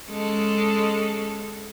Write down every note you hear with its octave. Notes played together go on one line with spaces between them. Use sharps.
G#3 C#4 A4